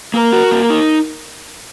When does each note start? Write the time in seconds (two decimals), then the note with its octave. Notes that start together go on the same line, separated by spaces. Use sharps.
0.14 A#3 A#4
0.33 F#4
0.51 A#3
0.70 D#4